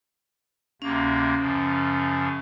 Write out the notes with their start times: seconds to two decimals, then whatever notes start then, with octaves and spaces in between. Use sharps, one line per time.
0.82 D2 C3 A#3 C#4
1.40 F#2 C#3 F3